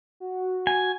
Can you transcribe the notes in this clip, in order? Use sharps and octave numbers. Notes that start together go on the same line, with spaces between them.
F#4
G#5